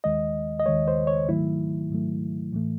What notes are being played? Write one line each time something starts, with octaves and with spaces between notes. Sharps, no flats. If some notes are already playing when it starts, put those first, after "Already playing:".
D#2 D#3 G#3 D#5
D#5
D#2 D#3 G#3 C#5
C5
C#5
G#2 D#3 F#3 A3 E4
G#2 D#3 F#3 A3
A2 E3 A3